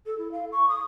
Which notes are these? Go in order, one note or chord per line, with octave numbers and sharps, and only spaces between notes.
A4
E4
F5
C#6
D#6